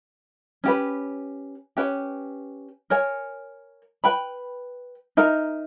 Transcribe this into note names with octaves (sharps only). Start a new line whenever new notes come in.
C#4 G4 B4
C#4 G4 B4 G5
A#4 C#5 G#5
B4 G5 B5
D#4 A#4 E5 A#5